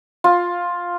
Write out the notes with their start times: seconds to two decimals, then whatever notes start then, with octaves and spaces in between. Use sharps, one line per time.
0.24 F4